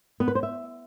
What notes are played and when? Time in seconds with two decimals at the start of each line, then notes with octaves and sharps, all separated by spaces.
0.20 B3
0.28 B4
0.35 C5
0.43 E5